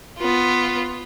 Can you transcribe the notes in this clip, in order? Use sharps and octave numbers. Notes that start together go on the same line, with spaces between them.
B3 F4